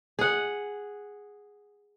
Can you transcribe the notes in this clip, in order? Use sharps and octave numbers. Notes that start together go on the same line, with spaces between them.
G#4 F#5